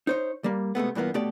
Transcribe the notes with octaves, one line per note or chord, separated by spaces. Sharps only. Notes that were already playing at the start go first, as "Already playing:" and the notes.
D#4 C5 C#5
G3 A#3
C3 G#3 A3 B3
G2 A#2 E3 A#3 B3
B2 A3 G4 A4 D5